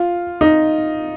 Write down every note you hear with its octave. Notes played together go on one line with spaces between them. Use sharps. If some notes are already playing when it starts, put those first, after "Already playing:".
Already playing: F4
D#4